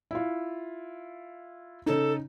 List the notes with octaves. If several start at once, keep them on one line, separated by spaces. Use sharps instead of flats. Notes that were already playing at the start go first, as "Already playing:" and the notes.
E4 F4
C#3 D#4 A4